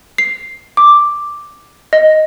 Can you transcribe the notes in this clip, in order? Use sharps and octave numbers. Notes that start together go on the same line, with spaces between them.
C7
D6
D#5